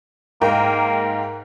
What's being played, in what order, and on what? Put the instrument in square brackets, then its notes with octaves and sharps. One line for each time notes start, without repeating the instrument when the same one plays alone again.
[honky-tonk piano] G#2 A#4 G5 [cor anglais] A#3